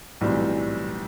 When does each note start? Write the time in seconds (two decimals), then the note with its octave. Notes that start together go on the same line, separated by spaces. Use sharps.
0.21 B1 A2 E3 G3 C4